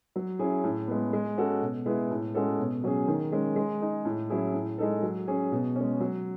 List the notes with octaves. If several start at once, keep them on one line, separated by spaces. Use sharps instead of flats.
F#3
C#4 E4 G#4
A2
G#3 B3
G#3
C#4 F#4 A4
B2
G#3 B3 E4 G#4
A2
G#3 C#4 F#4 A4
B2
F#3 C#4 G#4
D#3
G#3 C#4
G#3
D#4 G#4
A2
F#3 C#4 E4 G#4
A2
G#3 D#4 A4
F#3
C#4 G#4
B2
G#3 C#4
F#3